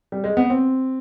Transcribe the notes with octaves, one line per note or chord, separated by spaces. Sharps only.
G3
G#3
B3
C4